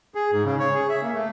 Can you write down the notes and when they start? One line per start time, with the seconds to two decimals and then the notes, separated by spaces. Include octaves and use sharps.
0.15 G#4
0.32 G#2
0.45 C#3
0.60 C#5
0.75 G#4
0.89 E5
1.02 A#3
1.14 A3